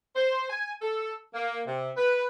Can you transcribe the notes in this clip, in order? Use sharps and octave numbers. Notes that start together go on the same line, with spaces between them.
C5
G#5
A4
A#3
C3
B4